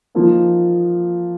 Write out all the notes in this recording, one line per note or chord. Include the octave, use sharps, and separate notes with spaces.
F3 A#3 D#4